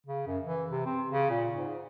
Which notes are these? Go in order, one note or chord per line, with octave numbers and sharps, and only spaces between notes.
C#3
F#2
E3
C3
C4
C#3
A#2
G#2